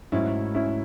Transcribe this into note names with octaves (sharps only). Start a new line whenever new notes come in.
G#2 F#3 A3 C#4 E4
C#4 E4